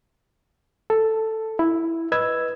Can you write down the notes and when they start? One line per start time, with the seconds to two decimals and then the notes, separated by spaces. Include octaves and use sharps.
0.90 A4
1.59 E4
2.12 B4 D#5 E6 G#6